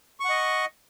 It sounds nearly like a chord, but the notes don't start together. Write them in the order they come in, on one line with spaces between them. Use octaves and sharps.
C#6 F#5 D#5